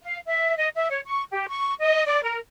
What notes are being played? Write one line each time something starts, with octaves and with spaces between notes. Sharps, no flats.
F5
E5
D#5
E5
C#5
C#6
G4
C#6
D#5
D5
A#4